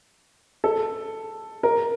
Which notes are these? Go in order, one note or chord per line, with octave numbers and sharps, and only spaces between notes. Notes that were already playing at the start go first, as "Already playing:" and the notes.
A4
A#4